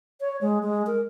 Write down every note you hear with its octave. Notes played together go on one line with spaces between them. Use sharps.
C#5
G#3
G#3
A#4